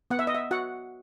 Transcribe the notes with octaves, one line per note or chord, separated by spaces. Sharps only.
B3 F#5
E5
D#5
E5
F#4 F#5